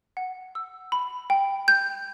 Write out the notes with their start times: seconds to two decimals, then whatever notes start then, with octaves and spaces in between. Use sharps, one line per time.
0.17 F#5
0.55 E6
0.92 B5
1.30 G5
1.68 G6